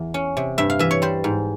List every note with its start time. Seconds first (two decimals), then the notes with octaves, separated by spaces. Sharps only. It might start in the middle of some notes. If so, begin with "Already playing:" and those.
Already playing: E2
0.14 C#4
0.37 C3
0.58 G2 E5
0.70 F5
0.79 E3 E5
0.91 C#5
1.02 G3 C5
1.24 G#2